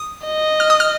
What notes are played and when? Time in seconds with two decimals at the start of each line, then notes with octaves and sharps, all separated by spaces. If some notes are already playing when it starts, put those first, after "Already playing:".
Already playing: D#6
0.25 D#5
0.60 F6
0.70 D#6
0.80 F6